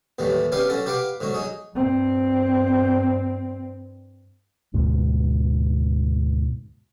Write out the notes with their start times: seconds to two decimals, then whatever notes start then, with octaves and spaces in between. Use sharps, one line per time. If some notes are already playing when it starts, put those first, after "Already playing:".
0.19 D#2 A2 E3 F#3 G3
0.52 C#3 B3 D4 G4 B4 F5
0.69 F#3 C#4 A4 F#5 A5
0.86 G4 B4 F5 F#5 D6
1.20 G#2 D3 F#3 F#4
1.34 F#3 D#4 G#4
1.75 G2 C4
4.74 D2 G#2 B2